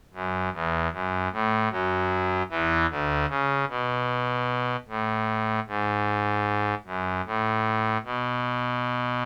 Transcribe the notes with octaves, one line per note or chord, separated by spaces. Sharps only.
F#2
E2
F#2
A2
F#2 F#3
E2 E3
D2 D3
C#3
B2
A2
G#2
F#2
A2
B2